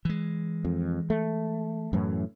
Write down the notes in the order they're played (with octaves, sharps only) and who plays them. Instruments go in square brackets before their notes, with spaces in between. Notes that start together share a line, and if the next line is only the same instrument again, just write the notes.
[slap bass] E3 G#3
[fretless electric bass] F2
A3
F#2 A2 E3